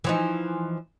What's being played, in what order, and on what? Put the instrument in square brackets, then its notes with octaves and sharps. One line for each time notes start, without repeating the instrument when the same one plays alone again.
[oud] E3 F3 D#4